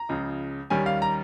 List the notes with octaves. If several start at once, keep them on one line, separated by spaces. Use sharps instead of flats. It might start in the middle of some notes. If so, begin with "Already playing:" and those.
Already playing: A#5
C#2 C#3 F3
D#2 D#3 G3 C#4 G#5
F5
A#5